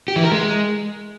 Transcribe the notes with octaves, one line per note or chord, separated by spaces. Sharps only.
G4
E3
A#4
G#3